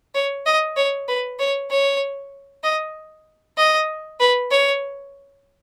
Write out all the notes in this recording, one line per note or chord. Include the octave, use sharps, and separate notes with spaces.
C#5
D#5
C#5
B4
C#5
C#5
D#5
D#5
B4
C#5